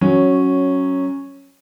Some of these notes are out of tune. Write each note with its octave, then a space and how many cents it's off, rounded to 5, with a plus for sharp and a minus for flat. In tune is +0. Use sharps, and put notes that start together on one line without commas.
F#3 +0 C#4 -5